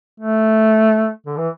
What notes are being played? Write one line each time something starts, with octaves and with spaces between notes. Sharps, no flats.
A3
D3
E3